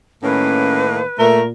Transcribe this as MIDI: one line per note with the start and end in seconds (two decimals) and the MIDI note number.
0.23 1.02 45
0.23 1.02 51
0.23 1.02 58
0.23 0.84 61
0.23 1.25 71
1.19 1.51 46
1.19 1.41 57
1.19 1.47 70